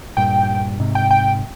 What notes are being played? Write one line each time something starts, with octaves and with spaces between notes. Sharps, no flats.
G2 A#2 G5
G#2 C3
G5
G5